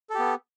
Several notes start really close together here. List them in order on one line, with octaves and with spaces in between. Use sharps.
A4 G4 B3